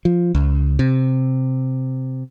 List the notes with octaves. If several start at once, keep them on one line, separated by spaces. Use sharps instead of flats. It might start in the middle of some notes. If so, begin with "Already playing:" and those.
F3
C#2
C3